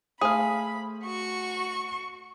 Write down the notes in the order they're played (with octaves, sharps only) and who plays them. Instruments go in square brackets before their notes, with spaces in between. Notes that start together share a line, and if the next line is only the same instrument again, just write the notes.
[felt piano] A3 C5 [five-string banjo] G#4 F5 [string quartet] B5
[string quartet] F#4 C#6